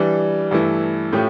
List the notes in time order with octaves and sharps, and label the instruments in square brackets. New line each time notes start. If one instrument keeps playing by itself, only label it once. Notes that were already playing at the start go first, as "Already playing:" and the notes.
Already playing: [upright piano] E3 G3 D4
G2 E3 A3 E4
A2 F3 A3 C#4 G4